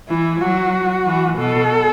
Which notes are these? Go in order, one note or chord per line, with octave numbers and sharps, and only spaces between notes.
E3 E4
F#3 F#4
E3
B2 A4